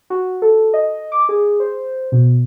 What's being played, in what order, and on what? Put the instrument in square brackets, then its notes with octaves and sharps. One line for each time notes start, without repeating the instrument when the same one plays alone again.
[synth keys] F#4
A4
D#5
D6
G#4
C5
B2